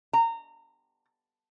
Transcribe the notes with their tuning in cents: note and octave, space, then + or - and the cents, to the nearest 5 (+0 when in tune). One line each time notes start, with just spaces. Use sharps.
A#5 -25